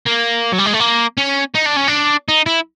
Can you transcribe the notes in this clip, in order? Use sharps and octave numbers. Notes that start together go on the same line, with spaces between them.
A#3
F#3
G3
G#3
A3
A#3
C#4
D#4
D4
C#4
D4
D#4
E4